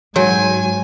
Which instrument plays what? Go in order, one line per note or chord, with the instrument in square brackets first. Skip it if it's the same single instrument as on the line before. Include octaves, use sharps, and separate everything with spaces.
[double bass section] G#2 [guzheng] F#3 [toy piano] F#4 C#5 [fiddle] G#5